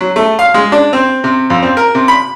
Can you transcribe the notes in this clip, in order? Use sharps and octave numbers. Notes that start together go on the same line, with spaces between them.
F#3
A3
F5
G#3
D4
C4
C3
F2
C4
A#4
C3
B5